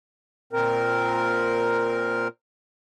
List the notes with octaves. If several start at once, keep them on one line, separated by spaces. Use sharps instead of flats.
A#2 C4 A#4